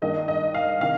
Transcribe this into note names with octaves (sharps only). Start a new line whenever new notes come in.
G2 D#3 A#3 D#5
D#5
F5
C3 D#3 F5